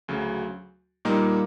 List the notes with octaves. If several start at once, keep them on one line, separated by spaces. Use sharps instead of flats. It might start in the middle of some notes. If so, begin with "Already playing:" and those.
D2 C#3 F#3
A#2 G3 A#3 D#4